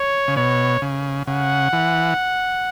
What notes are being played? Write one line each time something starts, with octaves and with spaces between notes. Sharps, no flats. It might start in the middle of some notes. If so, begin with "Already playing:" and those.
Already playing: C#5
C#3
B2 C#5
C#3
C#3 F#5
E3